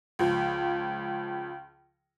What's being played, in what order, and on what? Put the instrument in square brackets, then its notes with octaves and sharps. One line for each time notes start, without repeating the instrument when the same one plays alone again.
[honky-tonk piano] C#2 F3